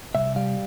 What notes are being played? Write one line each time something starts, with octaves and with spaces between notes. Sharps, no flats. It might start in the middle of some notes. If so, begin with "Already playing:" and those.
C2 E5
G3 F5